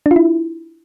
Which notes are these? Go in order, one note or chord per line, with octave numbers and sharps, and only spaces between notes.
D4
F4
E4